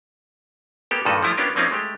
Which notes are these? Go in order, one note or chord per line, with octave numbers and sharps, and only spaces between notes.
A#3 B3 G4 A4
G2 A#2 D#3 F#4 A4 B4
F3 A3 E4 F4 G4
B3 C#4 D4 F4 G4 A#4
F3 A#3 C4 C#4 D#4 F4
G#3 A3 G4